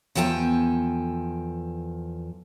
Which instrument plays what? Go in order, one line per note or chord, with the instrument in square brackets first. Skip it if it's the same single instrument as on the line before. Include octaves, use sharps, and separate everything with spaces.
[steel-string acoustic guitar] E2 F3 A4 G5 G#5